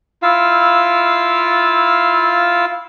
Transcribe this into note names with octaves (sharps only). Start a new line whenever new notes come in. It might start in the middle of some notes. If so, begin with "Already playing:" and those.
E4 F4 F5 E6